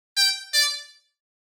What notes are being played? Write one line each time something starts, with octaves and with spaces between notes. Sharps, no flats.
G5
D5